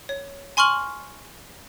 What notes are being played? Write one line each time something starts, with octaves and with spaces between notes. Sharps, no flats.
C#5
G#5 C6 C#6 F6 F#7